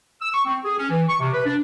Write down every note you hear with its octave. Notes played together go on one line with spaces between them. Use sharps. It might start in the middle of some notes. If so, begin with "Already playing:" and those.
E6
C#6
C4
G#4
C#4
E3
C#6
C3
B4
D4